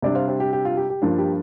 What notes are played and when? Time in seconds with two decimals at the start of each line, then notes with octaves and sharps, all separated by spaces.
0.02 C3 G3 D4 D5
0.15 C5 F5
0.28 G4 C5
0.40 G4
0.53 G4
0.65 F4
0.77 G4
0.90 G4
1.02 G2 F3 A#3 D4 F4
1.18 G4